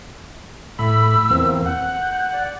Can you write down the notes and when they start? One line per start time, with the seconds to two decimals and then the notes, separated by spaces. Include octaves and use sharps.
0.79 A2 B5 E6
1.30 E2 A#3 C4
1.66 F#5 G6
2.32 D5